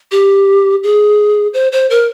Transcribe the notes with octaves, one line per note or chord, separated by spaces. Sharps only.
G4
G#4
C5
C5
A#4